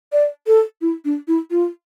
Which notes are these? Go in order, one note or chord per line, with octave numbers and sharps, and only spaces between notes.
D5
A4
E4
D4
E4
F4